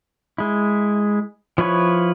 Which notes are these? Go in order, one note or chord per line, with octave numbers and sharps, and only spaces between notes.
G#3 E4
F3 E4 B4 C#5